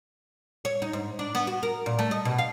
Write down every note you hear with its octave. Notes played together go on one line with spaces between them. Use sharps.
C#5
D#4
G#2
D4
B3
F#4
A#4
A#2
A3
D#5
B2
F5